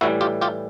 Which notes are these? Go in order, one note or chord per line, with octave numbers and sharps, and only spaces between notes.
A2 E3 G3 E4 F#4
F4 G4
F4 G4